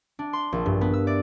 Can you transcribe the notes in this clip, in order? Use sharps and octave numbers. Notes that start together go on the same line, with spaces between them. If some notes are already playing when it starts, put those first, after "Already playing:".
D4
C6
A#1
G2
B3
E6
D5